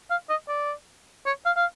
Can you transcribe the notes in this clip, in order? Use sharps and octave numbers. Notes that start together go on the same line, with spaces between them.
F5
D#5
D5
C#5
F5
F5